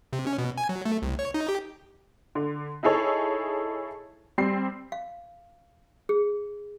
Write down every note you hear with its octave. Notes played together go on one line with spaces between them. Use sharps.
C3
C#4
B2
G#5
F#3
A3
C2
C#5
D#4
G4
D3
D#4 E4 G#4 A4 C#5
G3 C4 C7
F5
G#4